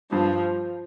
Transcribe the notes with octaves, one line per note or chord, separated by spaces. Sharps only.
G2 F3